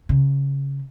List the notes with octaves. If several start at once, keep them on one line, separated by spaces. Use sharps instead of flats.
C#3